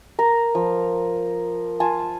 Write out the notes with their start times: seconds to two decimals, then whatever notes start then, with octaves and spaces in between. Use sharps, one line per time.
0.19 A#4 A#5
0.55 F3
1.80 F4 G#5 A5